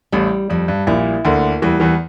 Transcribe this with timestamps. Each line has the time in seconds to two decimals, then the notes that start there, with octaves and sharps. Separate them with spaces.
0.12 A1 A2 G3
0.50 F2 G3
0.68 G2
0.87 A#1 A#2 E4
1.25 D2 D3 A#3
1.62 E2 E3 G3
1.80 E2 E3